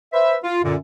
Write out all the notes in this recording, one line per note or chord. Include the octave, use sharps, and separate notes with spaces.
B4 C5 E5
F4
F#2 A#2 D3